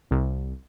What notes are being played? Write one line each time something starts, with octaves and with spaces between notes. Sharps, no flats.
C2